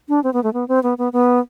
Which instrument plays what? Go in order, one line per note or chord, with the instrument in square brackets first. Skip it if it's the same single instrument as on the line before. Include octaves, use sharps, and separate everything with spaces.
[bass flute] D4
C4
B3
A3
B3
C4
B3
B3
B3